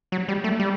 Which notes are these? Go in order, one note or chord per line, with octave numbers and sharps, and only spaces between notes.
F#3
G3
A3
G3